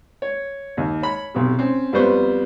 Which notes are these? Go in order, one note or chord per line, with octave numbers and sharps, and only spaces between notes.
C#5
D#2
C#5 B5
B1 C3
C4 C#4
F2 G3 B3 B4 C5 C#6